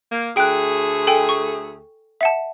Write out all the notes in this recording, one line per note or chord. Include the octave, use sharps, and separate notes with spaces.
A#3
D2 A3 G#4 G5 F#6
A4 G5 G#5
C#6
E5 F#5 A5